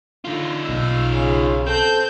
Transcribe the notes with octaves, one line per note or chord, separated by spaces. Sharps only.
D3 D#4 F4
B1 F5 E6
C#3
C4 A4 G6